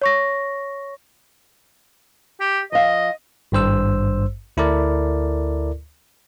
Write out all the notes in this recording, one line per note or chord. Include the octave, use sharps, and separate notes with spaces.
C#5 C#6 A#6
G4
F3 D#5 F5
G#1 G2 C5 E6
D2 E4 A4 A#4 D5